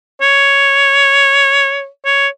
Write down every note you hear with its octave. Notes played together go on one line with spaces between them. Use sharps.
C#5
C#5